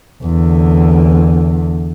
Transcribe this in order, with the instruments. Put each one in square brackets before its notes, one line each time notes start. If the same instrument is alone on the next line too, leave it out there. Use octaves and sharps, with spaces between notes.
[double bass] E2 D3